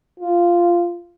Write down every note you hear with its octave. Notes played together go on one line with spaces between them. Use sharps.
F4